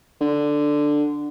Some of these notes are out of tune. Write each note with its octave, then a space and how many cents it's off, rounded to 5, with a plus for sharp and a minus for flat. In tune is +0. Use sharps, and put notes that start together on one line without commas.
D3 +5